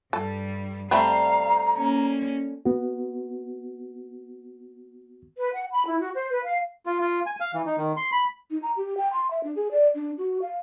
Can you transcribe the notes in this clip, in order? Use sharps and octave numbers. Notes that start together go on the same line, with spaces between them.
G2 G3 A4
G3 A3 C4 F5 A#5
A#3 C#4
B3 F#4
B4
F#5
B5
E4
F#4
C5
B4
F5
F4
F4
G#5
F5
E3
D#4
D#3
C6
B5
D#4
A#5
G4
G5
C6
E5
D4
G#4
D5
D4
F#4
F5